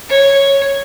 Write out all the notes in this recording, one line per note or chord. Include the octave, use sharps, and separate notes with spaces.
C#5